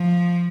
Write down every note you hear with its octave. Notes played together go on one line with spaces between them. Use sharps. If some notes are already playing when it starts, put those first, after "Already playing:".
Already playing: F3